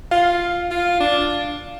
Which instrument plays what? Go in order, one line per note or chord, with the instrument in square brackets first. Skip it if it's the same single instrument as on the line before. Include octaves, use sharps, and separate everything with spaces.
[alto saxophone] F4 [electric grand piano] F5
[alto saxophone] F4
D4